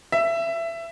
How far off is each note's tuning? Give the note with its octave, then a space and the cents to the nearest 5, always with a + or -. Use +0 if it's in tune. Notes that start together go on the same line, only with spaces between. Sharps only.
E5 +20